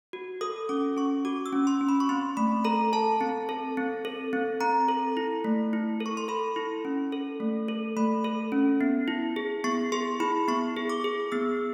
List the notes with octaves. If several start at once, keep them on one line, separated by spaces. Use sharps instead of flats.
F#4
A4 D#6
C#4 D6
C#4 C#6
F#4 D6
E6
C#4
C6
C#4
B5
C#6
C4 C6
A3 B5
A4 A#5
A4 A5
C4
A4
C4
A4
C4
C4 A#5
A4
E4
A3
E4
A4
C#6
C6
A4 B5
E4
C#4
A4
A3
A4
A3 B5
A4
C#4
B3
E4
G#4
B3 C#6
G#4 C6
E4 B5
B3 C#6
G#4
D6
G#4
B3 E6